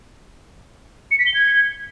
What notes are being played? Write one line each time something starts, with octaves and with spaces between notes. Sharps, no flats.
C#7
B6
G7
G#6